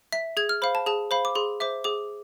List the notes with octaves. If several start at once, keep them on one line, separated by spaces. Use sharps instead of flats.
E5 B6
G#4 G#6
F6
C5 F5 B5
A5
G#4 A5
C5 F5 B5
D6
G#4 C6
C5 E5 D6
G#4 D6